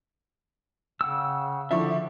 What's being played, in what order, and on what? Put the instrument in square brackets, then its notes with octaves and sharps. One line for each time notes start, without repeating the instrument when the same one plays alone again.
[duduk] C#3 [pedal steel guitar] F#5 G5 E6
[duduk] D3 [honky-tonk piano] F3 D4 E4 [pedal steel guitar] E5 C#6